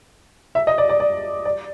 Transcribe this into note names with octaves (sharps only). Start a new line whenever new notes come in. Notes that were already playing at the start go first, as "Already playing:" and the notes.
E5
D#5
D5
D5
D5
D5